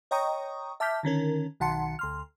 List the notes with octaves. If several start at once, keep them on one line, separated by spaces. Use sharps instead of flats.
C#5 D#5 G5 A#5 C#6 D#6
E5 A5 D6 F6 G6 B6
D3 D#3 C#4 A#4
B1 D#3 F#5 A5 C6 C#7
D2 C6 F6